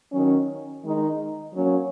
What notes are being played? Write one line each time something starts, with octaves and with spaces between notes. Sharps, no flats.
D#3 F#3 C#4
D#3 G#3 D#4
F#3 A#3 C#4